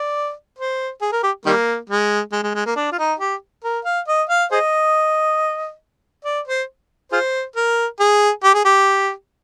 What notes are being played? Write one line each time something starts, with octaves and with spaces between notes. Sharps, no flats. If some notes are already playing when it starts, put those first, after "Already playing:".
Already playing: D5
C5
G#4
A#4
G4
D#3 G3 A#3
G#3
G#3
G#3
G#3
A#3
D4
F4
D#4
G4
A#4
F5
D#5
F5
G#4 C5 D#5
D5
C5
F4 G#4 C5
A#4
G#4
G4
G#4
G4